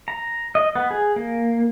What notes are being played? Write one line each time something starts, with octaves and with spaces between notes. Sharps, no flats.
A#5
D#5
B3
G#4
A#3